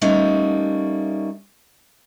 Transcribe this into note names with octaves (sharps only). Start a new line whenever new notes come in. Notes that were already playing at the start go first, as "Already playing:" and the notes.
G3 A3 A#3 C#4 D#4